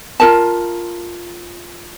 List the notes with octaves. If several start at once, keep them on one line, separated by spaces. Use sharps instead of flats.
F4 A#4 A5